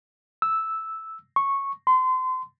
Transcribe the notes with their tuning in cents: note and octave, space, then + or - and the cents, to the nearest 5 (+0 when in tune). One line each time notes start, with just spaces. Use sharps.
E6 -5
C#6 -10
C6 -30